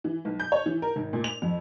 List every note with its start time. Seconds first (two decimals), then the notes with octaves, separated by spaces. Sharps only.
0.04 E3
0.25 B1
0.40 G6
0.52 C#5
0.66 E3
0.82 A#4
0.96 G#1
1.13 A#2
1.24 F7
1.42 F2